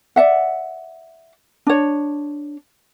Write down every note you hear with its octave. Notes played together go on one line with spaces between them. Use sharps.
D5 E5 F#5
D4 C#5